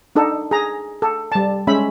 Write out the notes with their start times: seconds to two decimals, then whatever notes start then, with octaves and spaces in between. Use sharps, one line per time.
0.16 D4 D#4 A4
0.51 G#4 A#5
1.02 A4
1.32 G3 A5
1.67 G#3 C#4 E5 B5